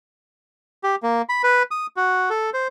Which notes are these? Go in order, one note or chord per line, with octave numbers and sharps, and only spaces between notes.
G4
A#3
B5
B4
D#6
F#4
A4
C5